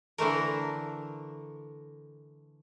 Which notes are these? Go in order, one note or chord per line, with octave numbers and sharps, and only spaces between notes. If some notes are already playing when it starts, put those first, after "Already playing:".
D3 E3 A3 A#4